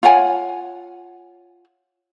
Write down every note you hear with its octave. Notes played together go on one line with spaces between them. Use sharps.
F4 C#5 F#5 G#5